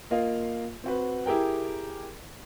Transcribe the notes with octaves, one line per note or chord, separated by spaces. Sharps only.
A#3 F4 D#5 F5
C4 F#4 B4
E4 G4 G#4 A#4 G5